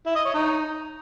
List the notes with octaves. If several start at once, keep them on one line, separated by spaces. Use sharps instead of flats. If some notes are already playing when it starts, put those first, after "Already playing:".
E4
D#5
C#5
D#4